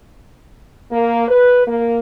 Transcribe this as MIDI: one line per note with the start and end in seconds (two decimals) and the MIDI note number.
0.91 1.27 58
1.28 1.63 71
1.66 1.99 58